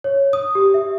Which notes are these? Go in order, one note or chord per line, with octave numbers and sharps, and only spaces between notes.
C#5
D#6
G4
E5